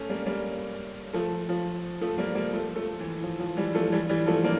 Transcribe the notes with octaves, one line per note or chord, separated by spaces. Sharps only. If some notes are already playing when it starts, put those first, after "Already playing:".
Already playing: A3 C#4
G3 A#3
G3 A#3
F3 A3
F3
F3 A3
G3 A#3
G3 A#3
F3 A3
F3 A3
E3
F3
F3
E3 G3
F3 A3
E3 G3
E3 G3
F3 A3
A#3 D4